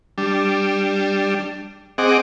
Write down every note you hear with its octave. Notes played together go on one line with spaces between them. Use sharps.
G3 D4
C4 G#4 D#5 F#5 D6